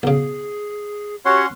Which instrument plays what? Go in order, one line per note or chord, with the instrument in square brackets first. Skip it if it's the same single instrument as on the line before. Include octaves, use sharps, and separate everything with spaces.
[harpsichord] B1 C#3 [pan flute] G#4
[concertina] C#4 F#5 C6 [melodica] F#4 C#5 [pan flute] G4